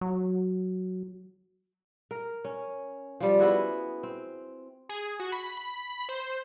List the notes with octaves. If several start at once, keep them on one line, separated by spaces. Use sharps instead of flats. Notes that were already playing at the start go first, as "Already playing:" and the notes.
F#3
A#4
C#4
F3 G3
B3 E4 F#4 G#4
C4
G#4
F#4
B5
B5
B5
C5